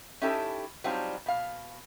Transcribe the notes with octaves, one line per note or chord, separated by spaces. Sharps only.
C#4 D#4 E4 G4 A4
F#3 G3 C4 D4 D#4 F4
B2 F5